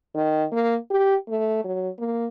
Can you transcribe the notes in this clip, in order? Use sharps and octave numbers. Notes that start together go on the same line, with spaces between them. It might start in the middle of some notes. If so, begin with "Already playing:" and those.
D#3
A#3
G4
A3
F#3
A#3